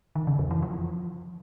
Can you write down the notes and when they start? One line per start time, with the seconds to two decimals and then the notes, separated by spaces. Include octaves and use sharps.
0.15 D#3
0.27 C#3
0.39 F2
0.51 E3
0.63 F3